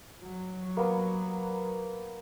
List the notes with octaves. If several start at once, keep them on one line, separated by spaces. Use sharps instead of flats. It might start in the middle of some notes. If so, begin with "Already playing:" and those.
F#3
A#3 B3